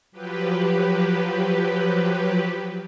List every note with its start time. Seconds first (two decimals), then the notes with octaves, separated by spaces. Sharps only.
0.12 F3 F#3 G4 B4